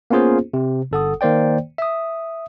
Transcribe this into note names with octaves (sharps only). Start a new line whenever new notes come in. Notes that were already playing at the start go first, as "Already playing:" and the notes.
A#3 B3 C#4 F4 G#4 C5
C3
G1 A4 F#5 D#6
D#3 A#3 C5 D5 G5
E5 D#6